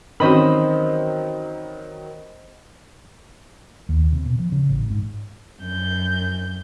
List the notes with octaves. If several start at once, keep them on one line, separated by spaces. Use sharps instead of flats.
D#3 E3 F#3 C4 C#4 C5 D#5 B5
D#2
C3
B2
F3
C#3
A1
G#2
F#2 G6